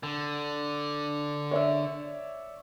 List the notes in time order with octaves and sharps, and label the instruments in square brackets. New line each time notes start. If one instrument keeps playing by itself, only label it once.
[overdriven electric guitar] D3
[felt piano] C#5 D5 E5